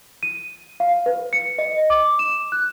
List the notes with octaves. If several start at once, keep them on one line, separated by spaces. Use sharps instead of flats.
D#7
F5
B4
C#7
D#5
D6
E7
F#6